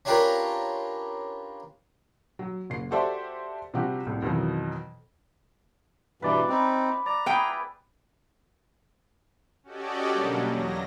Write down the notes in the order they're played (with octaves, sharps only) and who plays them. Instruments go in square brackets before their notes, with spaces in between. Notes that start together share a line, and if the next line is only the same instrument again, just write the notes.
[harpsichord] C#4 D4 F4 G4 A#4 B4
[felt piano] F#3
F#1 C7
F#4 G4 A4 C5 D5 E5
C3 F3 G3 F#4 G4
C2 A2
F2 B2 D#3 E3 F#3
[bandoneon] G2 B2 E3 [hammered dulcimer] B4 D5
[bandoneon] C4 D#4 [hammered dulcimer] B4
[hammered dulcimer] D5 [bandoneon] A#5
[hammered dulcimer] E4 G#4 [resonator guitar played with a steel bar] B4 G5
[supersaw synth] C#4 F#4 G4 A4 D5 D#5
B2 D3 F#3 G3 A#3
E2 F#3 A#6